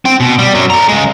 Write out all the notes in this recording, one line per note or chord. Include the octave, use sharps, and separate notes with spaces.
C4 G5
B2
G3
F#2 F#3
A4 A#5
C#3 G#3